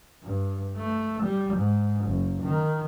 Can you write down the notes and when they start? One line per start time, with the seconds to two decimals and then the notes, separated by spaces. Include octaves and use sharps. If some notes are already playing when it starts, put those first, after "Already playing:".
0.23 G2
0.77 A3
1.23 G3
1.54 G#2
2.05 F#1
2.42 D#3